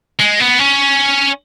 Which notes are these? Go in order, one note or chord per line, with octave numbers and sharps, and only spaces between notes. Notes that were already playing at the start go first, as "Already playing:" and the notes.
G#3
B3
C#4